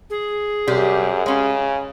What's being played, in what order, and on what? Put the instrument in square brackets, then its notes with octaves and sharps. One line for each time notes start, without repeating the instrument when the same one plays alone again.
[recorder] G#4
[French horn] F#2 [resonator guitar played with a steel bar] C3 G3 G4
[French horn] C#3 [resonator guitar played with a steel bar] G#3 C#4